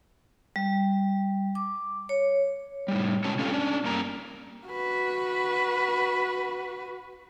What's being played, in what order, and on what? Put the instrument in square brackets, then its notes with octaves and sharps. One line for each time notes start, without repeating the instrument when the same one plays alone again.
[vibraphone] G3
D6
C#5
[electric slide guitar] A2 G3
B2 G#3 C#4 C#5 A5
C#4 F4 G4 A4 F5
C#4 D4
G2 A#3 A#5
[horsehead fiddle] F#4 B4